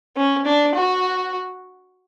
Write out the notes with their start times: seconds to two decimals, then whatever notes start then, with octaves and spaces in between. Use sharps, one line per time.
0.16 C#4
0.45 D4
0.74 F#4